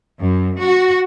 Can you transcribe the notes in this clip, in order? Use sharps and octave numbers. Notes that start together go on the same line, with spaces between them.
F#2
F#4